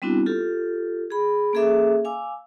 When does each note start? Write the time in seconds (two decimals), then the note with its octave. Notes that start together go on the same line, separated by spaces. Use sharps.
0.02 G3 B3 C4 D4 E4 F#4
0.26 F4 G4 A4
1.10 G#4 B5
1.53 A#3 C#4 G#4 A4 E5 D6
2.05 F5 G#5 D6 E6